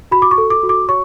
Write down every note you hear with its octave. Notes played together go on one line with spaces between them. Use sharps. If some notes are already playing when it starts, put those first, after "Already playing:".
F#4 B5
D6
C#6
A4
D6
F#4
D6
C#5 C#6